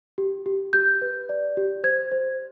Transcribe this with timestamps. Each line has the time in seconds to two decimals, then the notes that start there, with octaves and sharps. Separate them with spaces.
0.18 G4
0.46 G4
0.73 G4 G6
1.02 B4
1.29 D5
1.57 G4
1.84 C5 G#6
2.12 C5